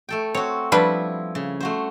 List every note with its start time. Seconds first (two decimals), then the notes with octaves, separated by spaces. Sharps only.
0.09 A3 A4 G5
0.34 C4 F#4 C#5
0.72 F3 G3 D4 E4 B4
1.35 C#3
1.60 A3 F#4 C5